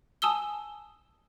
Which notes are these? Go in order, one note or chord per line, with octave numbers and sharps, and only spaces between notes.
G#5 A5 D#6 E6 G7